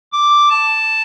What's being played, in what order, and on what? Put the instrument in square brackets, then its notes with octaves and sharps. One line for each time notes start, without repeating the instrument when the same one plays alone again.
[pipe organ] D6
A5